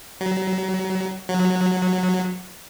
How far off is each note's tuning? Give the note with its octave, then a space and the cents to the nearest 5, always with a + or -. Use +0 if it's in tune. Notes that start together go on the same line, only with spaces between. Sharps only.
F#3 +30
F#3 -15